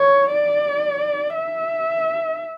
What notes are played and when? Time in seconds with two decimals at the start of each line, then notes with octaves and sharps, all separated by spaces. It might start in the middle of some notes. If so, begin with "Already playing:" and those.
Already playing: C#5
0.32 D5
1.35 E5